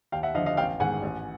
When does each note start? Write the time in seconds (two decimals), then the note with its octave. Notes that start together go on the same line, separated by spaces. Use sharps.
0.12 D#2 F5 G5
0.23 E5 F#5
0.35 D3 F3 D#5 F5
0.46 D#5 F5
0.57 A1 F5 G5
0.80 G#2 D#3 F#5 G#5
1.03 A1